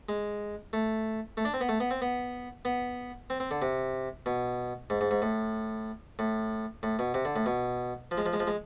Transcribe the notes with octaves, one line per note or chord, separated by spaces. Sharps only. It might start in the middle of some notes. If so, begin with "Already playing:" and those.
G#3
A3
A3
D4
C4
B3
A3
B3
C4
B3
B3
C4
C4
D3
C3
B2
G#2
G#2
G#2
A2
A2
A2
B2
C3
D3
A2
B2
F3
G#3
F3
G#3
F3
G#3